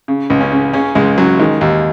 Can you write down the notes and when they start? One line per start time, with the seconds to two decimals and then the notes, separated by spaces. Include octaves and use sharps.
0.08 C#3
0.30 C#2
0.41 C#4
0.52 C#3
0.73 C#3 C#4
0.95 C#2 G#3
1.18 C#3 F#3
1.39 D#3 G#3
1.61 D#2